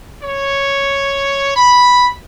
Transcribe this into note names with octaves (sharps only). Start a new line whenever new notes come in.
C#5
B5